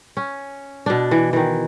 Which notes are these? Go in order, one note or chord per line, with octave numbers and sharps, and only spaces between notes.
C#4
B2 D4
E3
D#3 E3